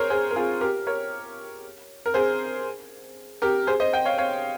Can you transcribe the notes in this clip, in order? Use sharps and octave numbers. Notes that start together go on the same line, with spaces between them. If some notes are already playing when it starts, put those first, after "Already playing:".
Already playing: G#4 A#4 C5 C#5
G#4 C5
A#4
F4 G#4
G4 A#4
A#4 C#5
A#4
G#4 C5
G4 A#4
G#4 C5
C5 D#5
D#5 G5
C#5 F5
C#5 F5